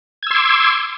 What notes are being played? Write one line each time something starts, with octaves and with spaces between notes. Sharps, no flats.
C6 D6 E6 G#6